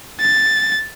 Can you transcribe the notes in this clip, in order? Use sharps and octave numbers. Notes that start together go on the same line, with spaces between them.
A6